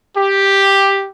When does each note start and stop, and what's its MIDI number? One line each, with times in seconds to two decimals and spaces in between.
0.17 1.07 67